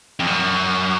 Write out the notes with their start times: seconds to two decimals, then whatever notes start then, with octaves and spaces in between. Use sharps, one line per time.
0.20 F2
0.27 F#2